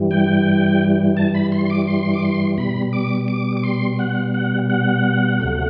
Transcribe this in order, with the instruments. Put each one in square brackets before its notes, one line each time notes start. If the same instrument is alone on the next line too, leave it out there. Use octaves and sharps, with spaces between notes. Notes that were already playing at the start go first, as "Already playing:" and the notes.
Already playing: [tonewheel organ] G2 E3 G3
G5
A5
B5
C6
C6
D6
C6
D6
C6
B2 G3 B5
D6
D6
D6
C6
F#5
F#5
F#5
D2 C3 F#3 A3